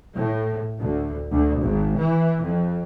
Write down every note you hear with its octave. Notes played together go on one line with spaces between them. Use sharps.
A2
D2
D2
G#1
E3
F2